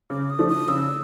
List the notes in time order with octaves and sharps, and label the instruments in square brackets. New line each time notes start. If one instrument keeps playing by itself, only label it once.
[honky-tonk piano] C#3 [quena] D6
[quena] D#6
[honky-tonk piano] F3 A3 D4
[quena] D#6
[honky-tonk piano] C#3 [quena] E6